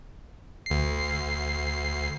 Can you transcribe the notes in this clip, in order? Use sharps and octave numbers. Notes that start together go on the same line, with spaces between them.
D2 C7